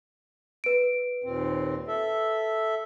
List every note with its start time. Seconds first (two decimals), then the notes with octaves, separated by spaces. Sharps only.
0.64 B4 D7
1.24 D#2 A#2 C4
1.88 A4 E5